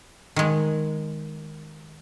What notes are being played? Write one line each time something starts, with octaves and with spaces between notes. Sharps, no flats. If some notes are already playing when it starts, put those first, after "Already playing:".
D#3 G#3